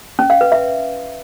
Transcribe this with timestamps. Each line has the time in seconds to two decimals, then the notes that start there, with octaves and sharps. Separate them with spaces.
0.19 C#4
0.30 F5
0.41 B4
0.52 E5